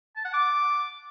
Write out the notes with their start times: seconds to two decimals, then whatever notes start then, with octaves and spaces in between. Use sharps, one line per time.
0.16 A5
0.25 F#5
0.33 D6